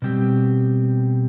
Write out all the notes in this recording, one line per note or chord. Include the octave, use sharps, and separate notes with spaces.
B2 G3 C4 G4